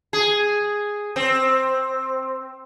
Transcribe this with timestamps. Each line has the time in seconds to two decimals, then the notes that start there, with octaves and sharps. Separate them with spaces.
0.13 G#4
1.16 C4